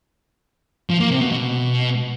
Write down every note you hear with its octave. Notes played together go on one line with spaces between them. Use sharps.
F3
A#3
C3
B2
B2